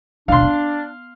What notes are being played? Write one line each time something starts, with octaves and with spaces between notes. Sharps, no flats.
D#2 B2 D4 F5 C6
B3